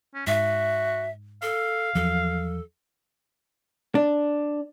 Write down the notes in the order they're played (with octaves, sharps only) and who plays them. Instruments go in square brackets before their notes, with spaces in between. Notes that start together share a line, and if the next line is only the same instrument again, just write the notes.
[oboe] C#4
[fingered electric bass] G#2 [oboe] F#4 [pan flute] E5
[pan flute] A4 [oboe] F5
[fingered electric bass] E2 F3 F#3 [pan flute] A4
[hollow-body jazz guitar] D4